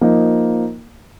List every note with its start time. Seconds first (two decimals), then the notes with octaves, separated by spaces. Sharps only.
0.01 F3 A#3 D#4